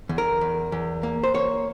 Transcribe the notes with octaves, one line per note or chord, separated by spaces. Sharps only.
E2
A#4
E2
E2
A#3
C5
A#3 C#5